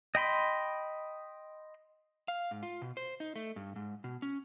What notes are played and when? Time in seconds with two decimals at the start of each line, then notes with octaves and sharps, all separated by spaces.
0.15 D#5 G5 B5 C6
2.28 F5
2.51 G#2
2.63 F4
2.82 B2
2.97 C5
3.20 D#4
3.36 A3
3.56 G2
3.76 G#2
4.04 B2
4.22 C#4